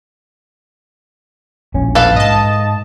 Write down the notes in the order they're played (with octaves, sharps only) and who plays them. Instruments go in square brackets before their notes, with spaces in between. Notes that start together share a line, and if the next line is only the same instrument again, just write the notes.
[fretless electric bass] E1 A#1 C#4
[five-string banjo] A4 B4 F5
[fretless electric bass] G#2 [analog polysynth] D#5 A5